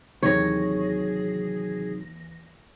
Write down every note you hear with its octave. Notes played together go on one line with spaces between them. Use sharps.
D#2 C3 D#3 E3 F#3 G#4 C#5 A#6